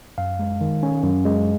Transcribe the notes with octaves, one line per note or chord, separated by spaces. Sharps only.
F#2 F5
G#3
D#3
C#4
F#2
G#3